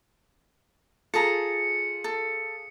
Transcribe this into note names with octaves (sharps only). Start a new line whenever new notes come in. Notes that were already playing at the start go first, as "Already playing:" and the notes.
F4 G#4 A4 A5 A#5 C#7
A4